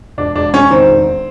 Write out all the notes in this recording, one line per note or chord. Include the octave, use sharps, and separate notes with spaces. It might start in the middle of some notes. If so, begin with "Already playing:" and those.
E1 D4
E1 D4
E1 C#4
D#3 C4
E1